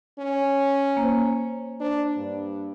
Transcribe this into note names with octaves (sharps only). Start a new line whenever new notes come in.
C#4
A#3 C5
D4 C5
G2